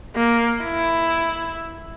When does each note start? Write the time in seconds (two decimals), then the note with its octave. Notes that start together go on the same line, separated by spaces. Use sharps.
0.16 A#3
0.63 E4